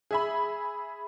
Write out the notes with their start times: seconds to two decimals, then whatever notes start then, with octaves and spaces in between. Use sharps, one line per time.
0.11 G#4 E5 B5